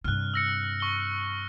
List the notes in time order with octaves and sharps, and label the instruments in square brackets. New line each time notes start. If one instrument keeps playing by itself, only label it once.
[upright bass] G2 C3 [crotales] F6 F#6
[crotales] E6 A#6 C#7
C#6 G7